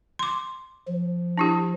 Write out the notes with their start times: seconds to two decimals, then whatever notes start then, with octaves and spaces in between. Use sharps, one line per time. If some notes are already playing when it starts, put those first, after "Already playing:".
0.19 C6 D6
0.88 F3
1.38 D4 E4 G4